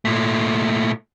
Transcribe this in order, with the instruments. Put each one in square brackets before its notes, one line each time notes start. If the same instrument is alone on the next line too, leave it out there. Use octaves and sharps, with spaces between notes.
[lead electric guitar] A#2 A3